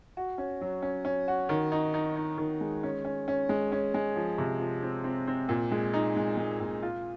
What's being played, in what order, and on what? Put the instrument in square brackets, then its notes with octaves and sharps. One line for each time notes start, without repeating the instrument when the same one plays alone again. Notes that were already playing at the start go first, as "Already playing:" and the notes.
[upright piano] F#4
C#4
F#3
C#4
C#4
F#4
D#3
D#4
D#4
D#4
D#3
G#3
C#4
C#4
C#4
G#3
C#4
G#3
F3
C3
F3
C4
C4
C4
A#2
G#3
D#4
G#3
G#3
A#2
F4